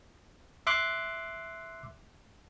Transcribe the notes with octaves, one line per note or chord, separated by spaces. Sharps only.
E5 C6 D6 F#6